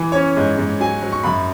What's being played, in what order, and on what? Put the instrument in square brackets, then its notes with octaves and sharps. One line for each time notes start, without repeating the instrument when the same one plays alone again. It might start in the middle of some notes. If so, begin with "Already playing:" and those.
Already playing: [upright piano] E3
[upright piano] C#4 [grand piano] C#5
[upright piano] G#2
G#2
[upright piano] F#3 [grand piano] G#5
[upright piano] F#3
[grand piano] C#6
[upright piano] F#2 [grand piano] B5